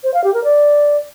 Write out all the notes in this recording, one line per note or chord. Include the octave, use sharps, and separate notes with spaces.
C5
F5
G4
A#4
D5